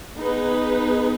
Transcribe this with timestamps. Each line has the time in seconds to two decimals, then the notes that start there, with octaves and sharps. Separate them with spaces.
0.19 B3 D#4 G#4 B4